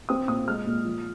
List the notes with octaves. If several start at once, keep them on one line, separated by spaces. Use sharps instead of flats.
C4 D#6
A#2 D#6
G#3 F6
A#2
F3